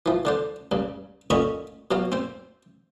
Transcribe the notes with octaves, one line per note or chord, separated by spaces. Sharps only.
E3 F3
D3 D4 C5
G2 C#3
A#2 D3 C#4 D#5 B5 C#6
B2 F#3 F5
C4 C5